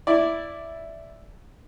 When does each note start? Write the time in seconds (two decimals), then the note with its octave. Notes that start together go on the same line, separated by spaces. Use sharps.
0.07 E4 D5